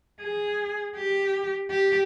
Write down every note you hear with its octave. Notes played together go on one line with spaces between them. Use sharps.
G#4
G4
G4